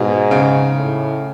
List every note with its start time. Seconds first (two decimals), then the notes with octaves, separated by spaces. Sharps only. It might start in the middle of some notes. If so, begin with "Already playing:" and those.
Already playing: G#2 B2
0.31 C#3
0.75 A2